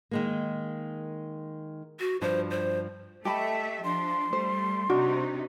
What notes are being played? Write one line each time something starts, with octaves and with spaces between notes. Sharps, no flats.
D#3 G#3 A#3
F#4
G2 F3 D4 C5
C5
A3 G4 D#5 E5 A5 B5
F3 D4 C6
G3 A3 C5
C3 D4 D#4 F#4